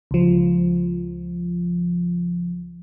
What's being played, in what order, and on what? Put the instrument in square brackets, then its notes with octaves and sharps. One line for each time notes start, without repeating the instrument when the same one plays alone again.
[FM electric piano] C#2 F3